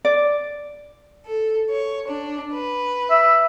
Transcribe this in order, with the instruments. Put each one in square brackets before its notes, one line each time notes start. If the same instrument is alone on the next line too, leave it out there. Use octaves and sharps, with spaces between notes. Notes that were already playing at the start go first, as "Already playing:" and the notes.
[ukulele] D5
[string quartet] A4
C#5
D4
B4
[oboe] E5